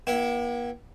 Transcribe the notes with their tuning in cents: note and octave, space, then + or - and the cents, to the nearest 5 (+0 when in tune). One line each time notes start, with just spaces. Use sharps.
A#3 +45 E4 +0 G5 -30